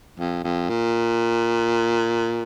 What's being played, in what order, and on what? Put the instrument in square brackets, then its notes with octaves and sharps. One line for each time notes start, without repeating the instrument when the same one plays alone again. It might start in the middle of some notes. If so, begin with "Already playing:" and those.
[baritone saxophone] F2
F2
A#2